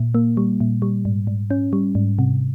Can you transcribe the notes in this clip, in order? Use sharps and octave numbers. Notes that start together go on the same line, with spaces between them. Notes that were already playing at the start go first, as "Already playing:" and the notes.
Already playing: A#2
A#3
G3
A#2
G3
G#2
G#2
C#4
G3
G#2
C3